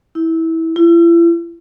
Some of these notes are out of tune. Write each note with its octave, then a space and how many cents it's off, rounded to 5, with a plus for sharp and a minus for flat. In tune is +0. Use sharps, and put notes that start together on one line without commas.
E4 -20
E4 +40